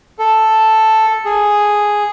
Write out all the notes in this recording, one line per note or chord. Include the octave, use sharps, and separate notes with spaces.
A4
G#4